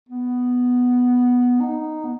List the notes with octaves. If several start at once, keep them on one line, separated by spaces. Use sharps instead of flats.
B3
D#4
B3